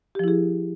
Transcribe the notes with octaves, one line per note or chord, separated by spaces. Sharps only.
F3 E4 G4 G#4